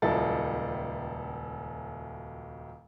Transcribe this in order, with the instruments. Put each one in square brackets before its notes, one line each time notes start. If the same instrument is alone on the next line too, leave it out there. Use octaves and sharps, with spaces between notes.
[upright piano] D#1 C#2 F#3 E4 A4 A6